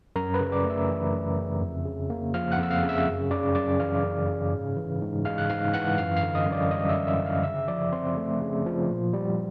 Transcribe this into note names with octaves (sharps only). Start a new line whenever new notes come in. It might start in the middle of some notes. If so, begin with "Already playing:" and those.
F#2 A#4 A#5
B4 B5
C#3
D5 D6
A3
E5 E6
E3
F#2
C#3
F2
C#3
A#3
F3 F5 F6
F#5 F#6
F2 E6
F5 F6
C#3
E5 E6
F#2
C#3 D5 D6
F#2 D5 D6
E3 F5 F6
F#2
C#3
G#2
E3
G#2
G#3 F5 F6
F#6
G#2 F5 F6
E3 F#5 F#6
F#2 F5 F6
F5 F6
D3
D#5 D#6
F#2
D5 D6
G3 D#5 D#6
E5 E6
F#2
E5 E6
D3
F5 F6
C#3 E5 E6
F3 D5 D6
C4 C5 C6
A3
C#3
F3
A#2
G3